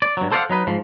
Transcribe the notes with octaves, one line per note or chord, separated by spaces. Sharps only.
D5
G2 F#3
A4 C5 D5 D#5 F5 F#5
F#3 D#4 B4
G#2 F3